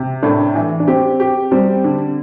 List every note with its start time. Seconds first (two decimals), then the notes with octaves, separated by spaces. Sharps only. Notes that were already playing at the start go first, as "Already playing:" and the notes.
Already playing: C3
0.23 A2 D4
0.55 E3
0.80 D4
0.88 C4 G4
1.20 G4
1.51 G3 C4
1.84 D3